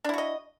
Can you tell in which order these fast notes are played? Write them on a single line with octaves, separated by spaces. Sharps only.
D4 E4 F#4 D#5